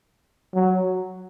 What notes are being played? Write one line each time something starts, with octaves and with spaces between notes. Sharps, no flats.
F#3